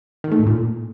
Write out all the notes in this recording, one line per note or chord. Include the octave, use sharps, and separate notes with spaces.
D#3
A3
A2
A#2